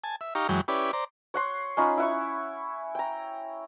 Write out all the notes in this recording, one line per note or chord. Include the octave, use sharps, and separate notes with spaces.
G#5 A5
E5
D#4 G4 F5 A#5 C#6
F#2 E3 F#3 G#3 G5
C#4 E4 G4 B4 D5
C5 D5 A#5
C#5 F#5 C6
C#4 D#4 F4 B5
E4 F#5 C#6
G5 A#5